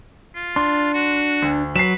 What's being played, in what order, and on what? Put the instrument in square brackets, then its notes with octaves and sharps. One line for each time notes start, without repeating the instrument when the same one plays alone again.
[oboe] F4
[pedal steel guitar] D4 [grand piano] C6
[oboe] F#4
[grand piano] D2
[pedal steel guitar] F#3 [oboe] B4 [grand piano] C7 E7